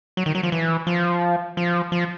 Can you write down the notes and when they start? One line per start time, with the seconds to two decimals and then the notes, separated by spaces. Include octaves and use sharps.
0.17 F#3
0.26 D#3
0.35 F#3
0.43 F3
0.52 E3
0.87 F3
1.57 F3
1.92 F3